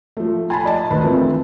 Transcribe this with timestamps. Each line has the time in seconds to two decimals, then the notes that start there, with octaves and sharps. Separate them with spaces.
0.17 F3 A3
0.50 G#5 A5 B5
0.65 D5 D#5 A5
0.90 D2 D#3 B4 B5
1.03 E3 F3 A3 C4